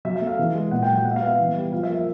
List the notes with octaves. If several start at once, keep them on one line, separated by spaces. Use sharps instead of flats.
F#3 E5
E5
A3
F5
E3
G#3
A#2 F#5
G5
F#3
G5
G#3 F#5
E5
F5
B3
F5
E3
G3
F3 F5
E5
A#3
E5